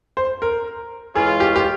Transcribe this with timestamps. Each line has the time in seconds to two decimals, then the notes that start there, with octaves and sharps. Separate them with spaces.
0.17 C5
0.42 A#4
1.15 E3 G#3 C#4 F4 G#4
1.40 G4
1.56 G4